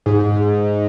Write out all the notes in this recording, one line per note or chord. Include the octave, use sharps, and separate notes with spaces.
G#2